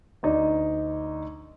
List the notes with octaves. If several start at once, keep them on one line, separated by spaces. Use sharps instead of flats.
D2 D#4 D5